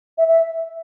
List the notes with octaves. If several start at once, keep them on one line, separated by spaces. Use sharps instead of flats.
E5
E5